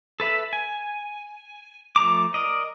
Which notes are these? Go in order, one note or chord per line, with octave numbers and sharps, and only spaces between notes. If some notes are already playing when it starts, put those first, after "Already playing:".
A4 B4 E5 B5
G#5
F3 A3 A#5 D6
A#4 D5 D#5